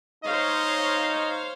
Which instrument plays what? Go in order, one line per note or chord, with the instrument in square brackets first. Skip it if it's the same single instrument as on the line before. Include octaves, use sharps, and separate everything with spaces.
[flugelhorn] D#4 [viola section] C5 C#5 F5 [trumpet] D#5